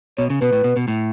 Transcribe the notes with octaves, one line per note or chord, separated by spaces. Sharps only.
B2 C#5
C#3
B2 B4
A2
B2
B2
A2